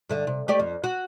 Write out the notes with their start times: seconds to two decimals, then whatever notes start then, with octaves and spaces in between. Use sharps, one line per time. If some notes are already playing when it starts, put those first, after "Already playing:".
0.09 G2 D3 E5
0.27 C3
0.48 A3 G4 D5
0.59 F2
0.84 F#4